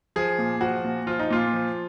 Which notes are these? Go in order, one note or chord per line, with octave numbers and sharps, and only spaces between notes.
F3 G#4
A#2
F3 F#4
A#2
F3 F4
D#4
A#2 F4
F3